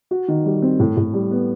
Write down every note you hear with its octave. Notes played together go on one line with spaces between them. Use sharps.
F#4
D#3
G3
C4
A2
A2
G3
B3